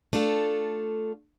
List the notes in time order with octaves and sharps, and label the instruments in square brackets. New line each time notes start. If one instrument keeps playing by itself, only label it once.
[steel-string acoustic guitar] A3 D4 F4 A4